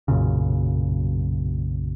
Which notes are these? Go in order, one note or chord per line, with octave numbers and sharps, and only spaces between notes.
B1 F#2 A#2 C#3